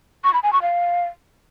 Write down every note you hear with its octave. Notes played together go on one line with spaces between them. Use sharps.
C#6
B5
G#5
C#6
F5